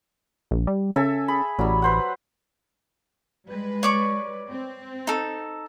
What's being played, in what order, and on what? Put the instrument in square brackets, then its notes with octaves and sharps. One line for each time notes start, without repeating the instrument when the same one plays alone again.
[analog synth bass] A#1
G3
[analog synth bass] C#3 [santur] A4 E5 G#5
[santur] G#4 B5
[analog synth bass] A1 [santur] F#3 G3
[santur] B4 C5 F#5
[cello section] G3 G#3 B4
[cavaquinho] C#5 D5 C#6
[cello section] C4
[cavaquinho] D#4 A4